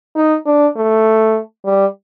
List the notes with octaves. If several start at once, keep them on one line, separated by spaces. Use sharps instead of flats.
D#4
D4
A3
G3